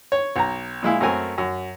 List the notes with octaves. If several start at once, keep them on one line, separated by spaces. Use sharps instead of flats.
C#5
B1 A#5
A#2 G#3 E4 F5
F#2 A3 C4 A#4 G#5
F#2